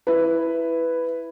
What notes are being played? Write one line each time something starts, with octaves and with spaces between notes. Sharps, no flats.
E4 B4